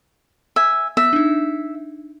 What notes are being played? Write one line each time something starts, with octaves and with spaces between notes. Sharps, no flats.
E5 G#5
B3 E5
D4 D#4